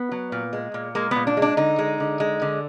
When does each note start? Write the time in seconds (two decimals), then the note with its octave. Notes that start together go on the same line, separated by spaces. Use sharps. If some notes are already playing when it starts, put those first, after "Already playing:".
Already playing: B3
0.12 F#3
0.32 A#2
0.53 G#3
0.74 A#2
0.95 G#3 A#3
1.11 A#2 B3
1.27 D4
1.37 G#3
1.42 D4
1.57 D3 D#4
1.79 G#3
2.00 D3
2.20 G#3
2.42 D3